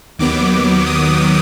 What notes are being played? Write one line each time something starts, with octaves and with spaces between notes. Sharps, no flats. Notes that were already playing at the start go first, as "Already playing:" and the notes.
D#2 D#3 F#3 B3 D6
D6
D#6